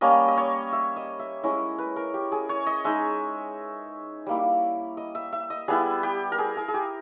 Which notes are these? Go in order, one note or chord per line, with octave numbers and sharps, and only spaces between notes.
G3 A#3 C#4 D#5
D#5
C#5
E5
D#5
E5
G#3 C#4 E4 D#5
B4
A#4
G4
G#4
C#5
D#5
G#3 D#4 E5
G3 A#3 E4
D#5
E5
E5
D#5
G3 B3 E4 G#4
G4
A#4
G#4
G#4
G#4
G4